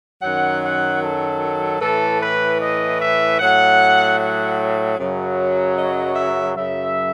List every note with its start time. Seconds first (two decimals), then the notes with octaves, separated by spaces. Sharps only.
0.22 F#2 D#3 F#3 F#5
0.63 F#5
1.02 A4
1.81 A2 E3 A4
2.20 B4
2.60 D#5
2.99 E5
3.39 A2 F#3 F#5
4.18 F#5
4.98 F#2 C#3 F#3
5.77 D#5
6.16 E5
6.56 F#2 C#3 F#3 E5